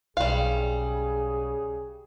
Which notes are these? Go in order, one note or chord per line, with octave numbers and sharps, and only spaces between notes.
B1 C#3 G3 G#4 F5